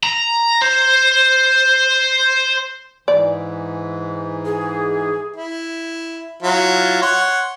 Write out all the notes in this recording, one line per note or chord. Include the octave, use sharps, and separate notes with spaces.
A#5
C5
G#2 E3 D5
G#4
E4
F#3 E4 F4
C#5 F#5 C6